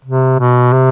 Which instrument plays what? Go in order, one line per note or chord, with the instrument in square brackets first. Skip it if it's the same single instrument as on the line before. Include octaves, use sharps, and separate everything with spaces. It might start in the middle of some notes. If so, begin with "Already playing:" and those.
[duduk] C3
B2
C3